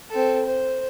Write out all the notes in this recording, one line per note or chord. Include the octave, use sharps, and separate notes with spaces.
C4 A4
C5